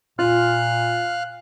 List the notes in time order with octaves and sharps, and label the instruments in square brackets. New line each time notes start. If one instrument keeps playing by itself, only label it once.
[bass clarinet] A#2 [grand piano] F4 [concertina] F5 F6 F#6